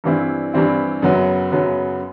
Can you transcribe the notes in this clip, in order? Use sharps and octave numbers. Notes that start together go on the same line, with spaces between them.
G2 E3 G3 C4 E4
G2 E3 G3 C4 E4
F#2 C#3 F#3 B3
F#2 C#3 F#3 B3